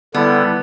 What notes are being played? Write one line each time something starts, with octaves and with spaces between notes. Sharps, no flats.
D3 G3 B3 E4 A4